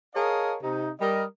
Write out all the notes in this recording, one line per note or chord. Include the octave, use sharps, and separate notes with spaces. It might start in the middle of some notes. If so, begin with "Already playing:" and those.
G#4 A#4 C#5 D#5 F5 A5
C3 D#4
G3 A#4 D#5